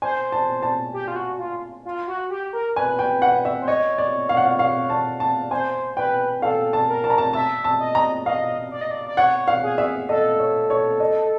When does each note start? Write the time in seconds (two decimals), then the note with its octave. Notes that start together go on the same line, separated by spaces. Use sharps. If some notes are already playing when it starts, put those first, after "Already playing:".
0.02 C5 G#5
0.32 A5
0.63 A5
0.93 G4
1.08 F4
1.16 F#4
1.39 F4
1.85 F4
2.08 F#4
2.30 G4
2.53 A#4
2.76 B4 G#5
2.99 G5
3.22 F#5
3.45 E5
3.61 C5
3.68 C#5 D#5
3.98 D5
4.29 F5
4.37 F#5
4.45 F5
4.59 F5
4.90 A5
5.20 A5
5.51 C5 G#5
5.97 B4 G5
6.42 A4 F5
6.73 A5
6.88 A#4
7.04 A5
7.10 A#5
7.18 A5
7.33 E5 A5
7.64 A5
7.80 D#5
7.95 A#5
8.26 D#5 F5
8.71 D5
8.81 D#5
8.91 D5
9.07 D5
9.17 C#5 F#5
9.48 F5
9.63 G#4
9.78 E5
10.09 A4 D#5
10.39 C#5
10.70 C#5
11.00 D#5